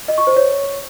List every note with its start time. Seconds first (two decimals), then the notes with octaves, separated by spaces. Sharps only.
0.08 D#5
0.18 C#6
0.27 C5
0.36 C#5